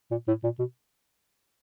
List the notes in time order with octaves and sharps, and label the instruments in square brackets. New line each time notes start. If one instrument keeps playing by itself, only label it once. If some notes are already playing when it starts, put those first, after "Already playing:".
[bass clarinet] A#2
A2
A#2
B2